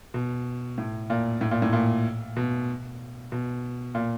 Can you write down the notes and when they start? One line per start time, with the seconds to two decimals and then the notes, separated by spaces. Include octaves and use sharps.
0.14 B2
0.78 A2
1.10 A#2
1.41 A2
1.51 A#2
1.62 A2
1.73 A#2
2.36 B2
3.32 B2
3.95 A#2